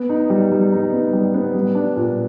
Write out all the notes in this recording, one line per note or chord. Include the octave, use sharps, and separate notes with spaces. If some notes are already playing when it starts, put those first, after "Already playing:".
Already playing: B3
D#4
G3
G3
D#4
B3
G3
B3
G3
D4
A#2